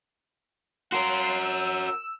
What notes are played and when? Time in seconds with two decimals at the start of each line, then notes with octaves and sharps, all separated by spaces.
0.92 F#4 A#4 C#5 F5 C6
1.43 E6